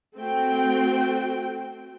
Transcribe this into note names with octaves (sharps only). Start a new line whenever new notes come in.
A3 C4 F#4 G5